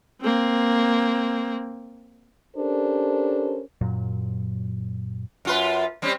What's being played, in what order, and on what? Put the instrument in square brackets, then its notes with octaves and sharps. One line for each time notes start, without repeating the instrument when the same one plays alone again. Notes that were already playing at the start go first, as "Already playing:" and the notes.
[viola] A#3 C4
[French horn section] C#4 D4 G4 A4 A#4 C5
[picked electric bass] F#2 A#2 F#3
[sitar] F#2 F4 B4
G3 C4 C#4